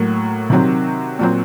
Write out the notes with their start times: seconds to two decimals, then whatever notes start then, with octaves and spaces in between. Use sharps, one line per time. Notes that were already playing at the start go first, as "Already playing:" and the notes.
Already playing: A2 F#3 A#3
0.50 C3 D#3 F#3 C4
1.19 A#2 F#3 C4